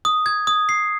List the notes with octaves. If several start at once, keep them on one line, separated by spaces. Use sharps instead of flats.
D#6
G#6
D#6
C7